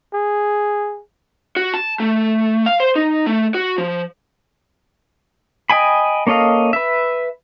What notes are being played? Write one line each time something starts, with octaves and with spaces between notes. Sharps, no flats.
G#4
F#4
A5
A3
F5
C5
D#4
A3
F#4
F3
D#5 G5 G#5 B5
A#3 C#4 A4 D#5 F5
B4 E5